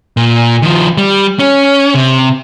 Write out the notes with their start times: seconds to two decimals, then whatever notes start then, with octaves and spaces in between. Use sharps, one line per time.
0.17 A#2
0.62 D#3 F3
0.97 G3
1.39 C#4
1.94 C3